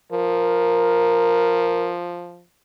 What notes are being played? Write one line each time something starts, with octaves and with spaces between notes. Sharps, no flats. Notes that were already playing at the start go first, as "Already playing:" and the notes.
F3 A#4